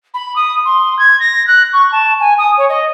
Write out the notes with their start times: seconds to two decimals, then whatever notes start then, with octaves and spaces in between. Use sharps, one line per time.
0.14 B5
0.36 D#6
0.65 C6
0.99 G#6
1.20 A#6
1.47 F#6
1.73 C#6
1.92 A5
2.20 G#5
2.39 D#6
2.58 C#5
2.69 D#5